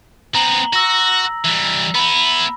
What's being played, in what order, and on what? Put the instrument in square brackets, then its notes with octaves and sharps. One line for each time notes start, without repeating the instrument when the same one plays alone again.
[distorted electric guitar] B3 C4 [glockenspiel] A#5 F#7
[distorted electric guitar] F#4 [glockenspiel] E6 A#6
[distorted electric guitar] E3 G3
[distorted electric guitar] B3 E4 [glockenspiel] B5